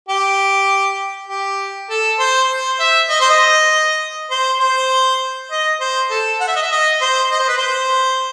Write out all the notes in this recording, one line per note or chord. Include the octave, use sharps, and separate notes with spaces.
G4
G4
A4
C5
C5
E5
D#5
C5
D#5
C5
C5
D#5
C5
A4
F#5
E5
D#5
E5
D#5
C5
D#5
C5
B4
C5